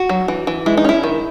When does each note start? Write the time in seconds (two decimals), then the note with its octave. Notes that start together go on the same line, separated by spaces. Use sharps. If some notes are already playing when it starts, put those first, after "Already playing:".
Already playing: F#4
0.09 F#3
0.28 E3
0.47 E3
0.66 G#3 E4
0.77 D#4
0.84 C#4 E4
1.03 D#3